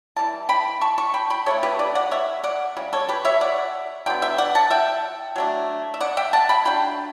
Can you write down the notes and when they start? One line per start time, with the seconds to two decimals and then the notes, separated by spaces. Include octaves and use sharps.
0.16 E3 G3 A5
0.49 G5 B5
0.81 A5 C#6
0.98 A5 C#6
1.14 G5 B5
1.30 G5 B5
1.46 C#3 E3 A3 D4 A4 C#5
1.63 G4 B4
1.79 B4 D5
1.95 D5 F#5
2.11 C#5 E5
2.44 D5 F#5
2.77 C#3 G3
2.93 A4 C#5
3.09 G4 B4
3.25 C#5 E5
3.41 D5 F#5
4.06 D3 F#3 B3 G5
4.22 E5 G5
4.38 D5 F#5
4.55 F#5 A5
4.70 E5 G5
5.36 F#3 A3 D4
5.94 E5
6.00 D5 F#5
6.17 E5 G5
6.33 F#5 A5
6.49 G5 B5
6.65 F#3 A3 D4 G5 B5